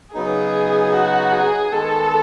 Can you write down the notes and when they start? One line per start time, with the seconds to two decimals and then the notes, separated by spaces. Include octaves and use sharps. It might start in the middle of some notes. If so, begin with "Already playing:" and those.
0.14 C#3 F#3 B3 D#4 G#4
0.93 F#4
1.32 G#4
1.72 D#3 G#3 B3 A4